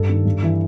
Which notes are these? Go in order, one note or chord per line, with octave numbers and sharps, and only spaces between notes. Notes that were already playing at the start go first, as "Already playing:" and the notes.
Already playing: G2 A4
D#3
G2
E3